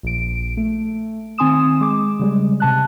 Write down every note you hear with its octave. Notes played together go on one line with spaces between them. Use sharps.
A#1 D7
A3
D#3 C4 G#5 C6 D#6 E7
G#3 D6
C#3 G3 G#3
C3 A5 F#6